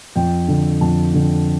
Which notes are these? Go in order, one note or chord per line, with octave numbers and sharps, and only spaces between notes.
F2 G5
D3
F2 A5
D3